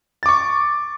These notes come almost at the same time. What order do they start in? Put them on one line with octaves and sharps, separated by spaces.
A6 D6 C#6